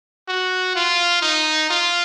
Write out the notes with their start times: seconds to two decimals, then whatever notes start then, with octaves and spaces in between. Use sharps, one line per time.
0.28 F#4
0.75 F4
1.22 D#4
1.70 F4